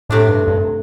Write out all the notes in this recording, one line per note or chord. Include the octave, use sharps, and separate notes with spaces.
A2 C3 A3 D4
G2
G2